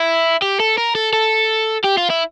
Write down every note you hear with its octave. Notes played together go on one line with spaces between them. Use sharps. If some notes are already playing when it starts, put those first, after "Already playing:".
Already playing: E4
G4
A4
A#4
A4
A4
G4
F4
E4